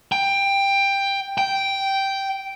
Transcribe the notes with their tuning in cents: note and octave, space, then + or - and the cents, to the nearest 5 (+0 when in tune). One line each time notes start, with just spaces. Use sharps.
G5 +15
G5 -5